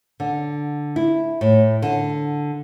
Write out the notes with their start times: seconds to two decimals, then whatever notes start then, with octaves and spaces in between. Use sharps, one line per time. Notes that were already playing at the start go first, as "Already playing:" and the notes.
0.20 D3
0.96 E4
1.41 A2
1.82 D3